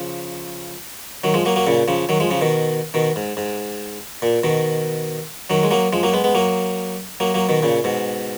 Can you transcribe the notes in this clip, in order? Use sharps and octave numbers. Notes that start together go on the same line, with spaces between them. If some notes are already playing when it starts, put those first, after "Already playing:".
Already playing: C#3 F3
D#3 F#3
F3 G#3
F#3 A#3
F#3 A#3
A#2 C#3
C#3 F3
D#3 F#3
F3 G#3
C#3 F3
B2 D#3
B2 D#3
G#2
G#2
A#2
B2 D#3
D#3 F#3
G#3
F#3 A#3
F3 G#3
F#3 A#3
G#3 B3
G#3 B3
F#3 A#3
F#3 A#3
F#3 A#3
B2 D#3
A#2 C#3
G#2 B2